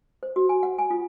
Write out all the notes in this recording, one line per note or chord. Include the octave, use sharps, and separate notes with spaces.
C5
F#4
G#5
F#5
G#5
F4